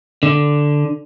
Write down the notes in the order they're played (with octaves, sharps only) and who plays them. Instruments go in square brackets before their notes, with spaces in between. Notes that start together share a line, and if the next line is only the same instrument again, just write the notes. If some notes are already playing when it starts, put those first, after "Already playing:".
[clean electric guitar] D3